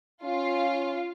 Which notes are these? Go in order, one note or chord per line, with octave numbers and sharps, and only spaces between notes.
C#4 F4